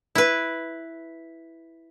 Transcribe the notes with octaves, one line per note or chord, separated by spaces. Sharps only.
E4 B4